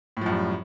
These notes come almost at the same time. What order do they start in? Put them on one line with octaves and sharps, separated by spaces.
A2 F3 F#2 G3